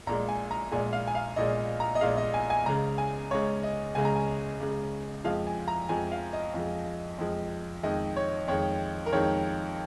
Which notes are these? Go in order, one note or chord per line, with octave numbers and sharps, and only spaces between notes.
A#1 A#2 G#3 A#5
G#5
A#5
A#1 A#2 G#3 G#5
F5
G#5
F5
A#1 A#2 G#3 D#5
A#5
D#5
A#1 A#2 G#3 F5
D#5
G#5
G#5
C#2 C#3 G#3 A#5
G#5
C#2 C#3 G#3 C#5
D#5
C#2 C#3 G#3 G#5
A#5
G#5
C#2 C#3 G#3
F2 F3 G#3 F5
G#5
A#5
F2 F3 G#3 G#5
F5
D#5
F2 F3 G#3
F2 F3 G#3
F2 D#3 G#3 D#5
C#5
F2 D#3 G#3 C#5
A#4
F2 D#3 G#3 C#5